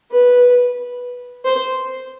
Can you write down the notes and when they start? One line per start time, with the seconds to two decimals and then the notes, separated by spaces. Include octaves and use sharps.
0.11 B4
1.45 C5